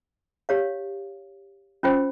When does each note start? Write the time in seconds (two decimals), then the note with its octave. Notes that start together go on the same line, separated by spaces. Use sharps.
0.49 G4 C#5 F5
1.83 C#4 F4 C5 G5